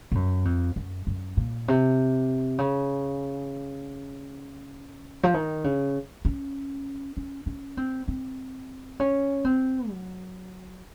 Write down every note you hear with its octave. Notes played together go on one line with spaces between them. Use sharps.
A2
F#2
F2
F#2
F#2
A#2
C3
C#3
F3
D#3
C#3
C#4
C#4
C#4
C4
C4
C#4
C4
F#3